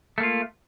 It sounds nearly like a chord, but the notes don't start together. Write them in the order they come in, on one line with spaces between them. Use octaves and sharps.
A3 A#3 F4